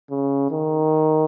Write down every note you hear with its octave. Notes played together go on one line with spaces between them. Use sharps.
C#3
D#3